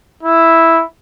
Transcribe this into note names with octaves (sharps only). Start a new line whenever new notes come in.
E4